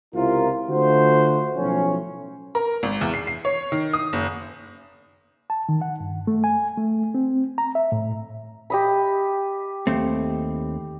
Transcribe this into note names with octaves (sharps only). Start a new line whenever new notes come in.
C#2 C3 E4 F4 A#4
D3 A3 F4 F#4 C5
B1 A2 F3 C#4
A#4
G#1
E2
C7
C7
C#5
D#3
D#6
F#1
A5
D#3
F#5
G2
A3
G#5
A3
C4
A#5
E5
A2
G4 D#5 B5
D#2 A3 C4